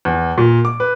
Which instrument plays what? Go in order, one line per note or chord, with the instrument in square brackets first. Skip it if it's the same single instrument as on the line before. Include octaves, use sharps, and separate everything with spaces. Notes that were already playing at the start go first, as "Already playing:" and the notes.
[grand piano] E2
A#2
D6
B4